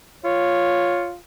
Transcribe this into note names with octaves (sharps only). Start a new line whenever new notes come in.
F4 C#5